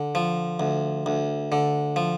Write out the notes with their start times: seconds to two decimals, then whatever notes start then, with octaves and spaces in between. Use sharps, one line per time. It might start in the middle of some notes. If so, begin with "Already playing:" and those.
Already playing: D3
0.15 F3
0.60 D2
1.06 D2
1.52 D3
1.96 F3